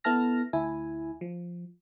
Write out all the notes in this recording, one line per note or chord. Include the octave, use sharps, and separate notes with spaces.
B3 E4 A4 A5 F6 A#6
D2 E4 G#5
F3